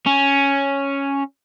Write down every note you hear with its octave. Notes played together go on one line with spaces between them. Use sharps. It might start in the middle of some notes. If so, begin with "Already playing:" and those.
C#4